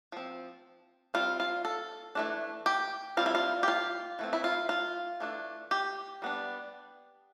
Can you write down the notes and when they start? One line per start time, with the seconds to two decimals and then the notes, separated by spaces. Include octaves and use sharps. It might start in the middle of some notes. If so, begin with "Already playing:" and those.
0.12 F3 C4
1.14 G3 C4 F4
1.40 F4
1.65 A4
2.15 E3 A3 D4
2.66 G4
3.17 G3 C4 F4
3.26 E4
3.35 F4
3.63 G4
3.68 F4
4.19 E3 A3 C4
4.33 E4
4.44 F4
4.69 F4
5.20 E3 A3 D4
5.71 G4
6.22 G3 B3 D4